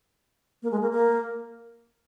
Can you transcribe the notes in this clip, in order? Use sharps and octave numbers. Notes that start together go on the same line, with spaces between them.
A#3
G#3
A#3
A#3